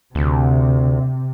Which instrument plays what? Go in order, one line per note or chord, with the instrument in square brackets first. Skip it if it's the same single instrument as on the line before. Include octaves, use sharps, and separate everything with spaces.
[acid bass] D2 [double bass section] C3